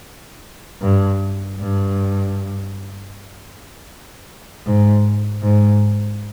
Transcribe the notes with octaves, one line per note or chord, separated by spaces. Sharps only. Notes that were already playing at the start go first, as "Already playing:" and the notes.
G2
G2
G#2
G#2